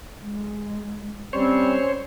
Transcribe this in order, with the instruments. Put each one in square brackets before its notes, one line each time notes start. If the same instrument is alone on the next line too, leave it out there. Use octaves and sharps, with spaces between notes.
[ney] G#3
[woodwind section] G3 C4 [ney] C#4 [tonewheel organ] C5 C#5